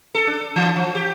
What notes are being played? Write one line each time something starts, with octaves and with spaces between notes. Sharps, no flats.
A4
D4
E3
F3
G4